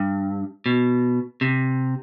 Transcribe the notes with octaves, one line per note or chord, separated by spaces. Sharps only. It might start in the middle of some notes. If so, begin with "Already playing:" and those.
Already playing: G2
B2
C3